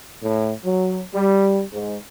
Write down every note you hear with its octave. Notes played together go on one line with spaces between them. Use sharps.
A2
F#3
G3
G#2